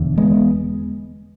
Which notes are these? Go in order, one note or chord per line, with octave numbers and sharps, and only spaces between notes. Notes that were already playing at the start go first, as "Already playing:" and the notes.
Already playing: E1 E2 D3
G#3 B3